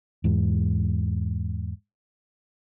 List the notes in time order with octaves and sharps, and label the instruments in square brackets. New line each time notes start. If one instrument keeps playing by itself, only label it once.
[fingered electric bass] E2 G#2